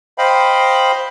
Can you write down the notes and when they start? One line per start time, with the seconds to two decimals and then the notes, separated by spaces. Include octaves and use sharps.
0.18 C5 D#5 F5 G5 B5